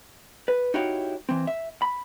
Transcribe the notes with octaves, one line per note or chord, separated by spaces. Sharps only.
B4
D#4 E4 F#4 G4 C#5 F5
E3 C4
E5
B5